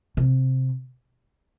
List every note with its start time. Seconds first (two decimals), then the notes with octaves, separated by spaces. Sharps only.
0.17 C3